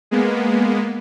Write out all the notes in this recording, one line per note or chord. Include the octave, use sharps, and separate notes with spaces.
G#3 A#3 B3